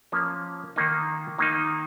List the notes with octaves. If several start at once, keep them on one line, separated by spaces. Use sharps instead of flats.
F3 A#3 C#4
D#3 A#3 D#4
D#3 A#3 D#4